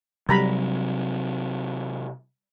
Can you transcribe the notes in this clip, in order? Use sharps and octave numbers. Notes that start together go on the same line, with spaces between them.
C3 F#3 G3 A#5 B5